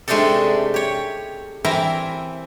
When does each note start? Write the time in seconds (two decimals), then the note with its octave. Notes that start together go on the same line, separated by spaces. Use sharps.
0.08 C3 G#3 A3 D4 D#4 A4
0.74 G4 C#5
1.65 E3 C4 E4 A#4 E5 A#5